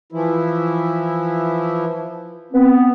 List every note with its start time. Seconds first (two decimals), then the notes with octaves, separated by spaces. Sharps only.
0.12 E3 F3 E4
2.53 B3 C4